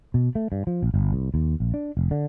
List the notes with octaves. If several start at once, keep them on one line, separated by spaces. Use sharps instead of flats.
B2
A3
G2
F3
A#1
G1
C2
D#2
A#1
D4
F1
D3